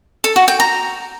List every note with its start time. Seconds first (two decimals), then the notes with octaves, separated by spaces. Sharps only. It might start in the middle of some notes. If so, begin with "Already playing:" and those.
0.24 A4
0.36 F#4
0.48 G5
0.60 A#5